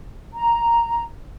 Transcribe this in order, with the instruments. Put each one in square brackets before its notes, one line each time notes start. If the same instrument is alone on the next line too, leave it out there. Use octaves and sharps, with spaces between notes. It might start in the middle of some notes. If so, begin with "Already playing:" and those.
[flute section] A#5